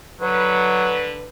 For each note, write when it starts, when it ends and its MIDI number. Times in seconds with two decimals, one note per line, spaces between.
0.21 1.28 50
0.21 1.03 54
0.21 1.28 71